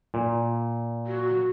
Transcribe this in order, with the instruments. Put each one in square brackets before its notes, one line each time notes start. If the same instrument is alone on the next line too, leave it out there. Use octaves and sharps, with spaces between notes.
[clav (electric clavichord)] A#2
[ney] F#4